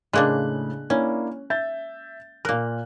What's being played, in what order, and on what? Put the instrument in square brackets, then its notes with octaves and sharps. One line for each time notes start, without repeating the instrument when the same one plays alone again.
[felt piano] A2 C#3 F#6 [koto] G#3 A#3 D4
[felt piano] A#3 D4 E4 [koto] C#4
[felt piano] E5 G6 A6
[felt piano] A#2 F#6 [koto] A#3 A#4